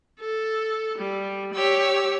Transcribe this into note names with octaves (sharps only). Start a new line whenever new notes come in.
A4
G3
G4 C#5 E6